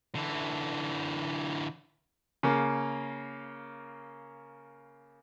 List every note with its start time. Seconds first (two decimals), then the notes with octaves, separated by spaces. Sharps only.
0.15 D3 E3
2.43 C#3 A#3